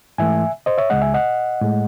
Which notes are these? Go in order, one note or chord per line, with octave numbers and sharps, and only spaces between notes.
G#2 E3 A3 E5 G#5
C5 D#5
C#5 E5
C#2 C#3 G#3 D#5 F#5
E5 G#5
D#5 F#5
A2 G#3